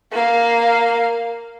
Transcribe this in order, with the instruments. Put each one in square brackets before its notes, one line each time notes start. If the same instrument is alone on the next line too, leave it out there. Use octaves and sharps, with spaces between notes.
[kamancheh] A#3 F5